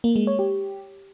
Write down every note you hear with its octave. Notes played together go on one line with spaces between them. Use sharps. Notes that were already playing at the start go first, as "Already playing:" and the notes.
A#3
G#3
C#5
G4